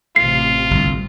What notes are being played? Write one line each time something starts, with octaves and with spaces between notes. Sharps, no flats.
A1 C3 F4 C7
G1 C2